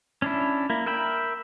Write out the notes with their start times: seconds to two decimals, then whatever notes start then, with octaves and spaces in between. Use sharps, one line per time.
0.22 C#4 D4 E4
0.70 A#3 E4
0.86 A#4 E5 G5 B5